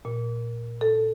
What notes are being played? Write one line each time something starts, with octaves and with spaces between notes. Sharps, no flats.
A#2
A4